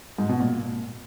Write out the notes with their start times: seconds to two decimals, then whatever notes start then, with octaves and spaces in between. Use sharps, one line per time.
0.18 G#2
0.29 B2
0.40 A#2